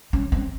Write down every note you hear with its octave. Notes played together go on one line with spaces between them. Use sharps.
C#4
C4